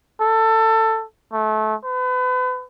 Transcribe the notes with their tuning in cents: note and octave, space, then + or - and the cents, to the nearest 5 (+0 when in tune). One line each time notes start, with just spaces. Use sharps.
A4 +20
A3 -25
B4 +35